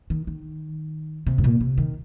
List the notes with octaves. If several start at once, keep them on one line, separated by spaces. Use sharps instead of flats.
D#3
D#3
C3
G#2
A#2
C3
D#3